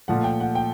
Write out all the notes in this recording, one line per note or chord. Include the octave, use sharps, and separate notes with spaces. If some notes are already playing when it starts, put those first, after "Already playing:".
A#2 F3 A3 F#5
G5
F#5
G5